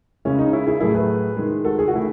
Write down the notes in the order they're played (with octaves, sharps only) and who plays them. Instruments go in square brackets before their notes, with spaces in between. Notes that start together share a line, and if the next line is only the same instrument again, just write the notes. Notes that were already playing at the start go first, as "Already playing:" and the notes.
[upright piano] C#3 G#3 C#4 E4
D#4
C#4 E4
E4 G#4
A2 F#3 A3 E4 G#4
G#4 B4
D#3 G#3
F#4 A4
G#4
F#4
D#3 A3 E4